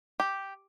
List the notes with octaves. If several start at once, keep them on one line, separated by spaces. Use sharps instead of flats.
G4